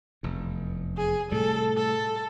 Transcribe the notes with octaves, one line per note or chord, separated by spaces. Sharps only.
F1 E2
G#4
A2 C3 G3 A4
A4